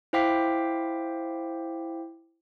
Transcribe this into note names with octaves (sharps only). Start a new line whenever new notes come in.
E4 C5 F5 G5 D6 B6